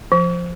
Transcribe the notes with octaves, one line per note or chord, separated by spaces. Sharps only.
F3